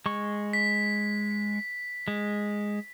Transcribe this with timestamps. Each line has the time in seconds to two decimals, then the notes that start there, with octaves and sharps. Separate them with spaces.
0.06 G#3 C#6
0.53 B6
2.08 G#3